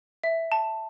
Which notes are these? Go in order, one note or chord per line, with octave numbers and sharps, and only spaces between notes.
E5
A5